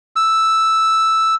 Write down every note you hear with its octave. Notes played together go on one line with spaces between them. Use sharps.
E6